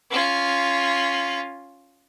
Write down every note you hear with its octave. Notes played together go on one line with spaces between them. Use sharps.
C#4 F4